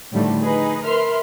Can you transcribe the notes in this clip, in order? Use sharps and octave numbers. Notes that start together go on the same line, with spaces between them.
A2 D3 D#3 F3 G3 A3
D#4 G#4 B4 D#5
A#4 B4 E5 C6 F6